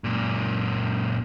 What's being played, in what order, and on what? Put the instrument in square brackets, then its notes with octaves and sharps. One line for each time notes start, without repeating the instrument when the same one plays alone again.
[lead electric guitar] F#2 A#2